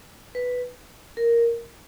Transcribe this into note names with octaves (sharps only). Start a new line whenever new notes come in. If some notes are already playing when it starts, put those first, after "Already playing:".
B4
A#4